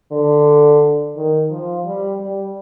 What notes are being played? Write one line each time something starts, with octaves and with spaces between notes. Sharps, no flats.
D3
D#3
F3
G3
G3